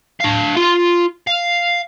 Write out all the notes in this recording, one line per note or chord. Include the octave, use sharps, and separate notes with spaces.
D4 F5
F4 C6
F5